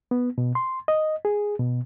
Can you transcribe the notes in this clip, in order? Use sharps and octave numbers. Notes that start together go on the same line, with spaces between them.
B3
B2
C6
D#5
G#4
B2